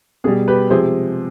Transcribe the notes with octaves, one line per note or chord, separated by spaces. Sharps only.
B2 G3 G#4
G4 B4
C3 F3 G#3 G#4 C5